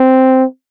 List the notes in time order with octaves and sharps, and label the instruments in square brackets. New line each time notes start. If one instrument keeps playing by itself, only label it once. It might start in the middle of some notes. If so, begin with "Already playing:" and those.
Already playing: [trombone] C4